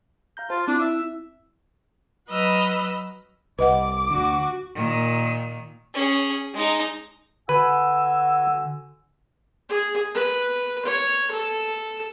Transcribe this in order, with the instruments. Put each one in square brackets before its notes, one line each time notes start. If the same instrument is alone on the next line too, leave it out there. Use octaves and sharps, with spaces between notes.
[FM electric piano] F5 A#5 G6
[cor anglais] F4 [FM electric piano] C5 F5 A5
[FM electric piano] C4 E4 [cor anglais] D4
[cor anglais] E5
[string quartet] F#3 B4 D#5 E6 F6
[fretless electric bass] C2 [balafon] B4 D#5 F#5 [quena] D6
[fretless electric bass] D2 D3 [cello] F#4
[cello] A#2 D#3
[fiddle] C#4 G#4
G#3 D#4
[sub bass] D3 [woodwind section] F#4 G#5 E6 [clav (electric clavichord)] B4
[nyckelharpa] G#4
B4
C#5
A4